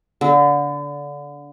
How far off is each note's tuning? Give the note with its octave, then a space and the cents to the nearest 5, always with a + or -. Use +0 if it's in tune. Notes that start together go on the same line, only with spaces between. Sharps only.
D3 -25